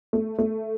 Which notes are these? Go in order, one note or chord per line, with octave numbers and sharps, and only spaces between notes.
A3
A3